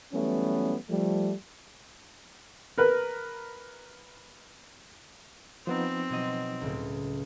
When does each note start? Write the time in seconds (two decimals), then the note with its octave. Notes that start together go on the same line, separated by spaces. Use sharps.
0.13 E3 F#3 G3 A3 B3 C#4
0.90 F3 G3 A3
2.78 A#4 B4
5.67 F3 B3 C4 D#4
6.10 B2 F#3 D#5
6.61 C#2 A2